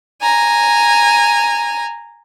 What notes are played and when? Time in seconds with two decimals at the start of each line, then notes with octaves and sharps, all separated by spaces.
0.22 G#5 A#5